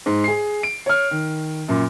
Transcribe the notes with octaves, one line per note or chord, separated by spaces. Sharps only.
G#2
G#4 C7
D7
C#5 F6
D#3
F#2 A#2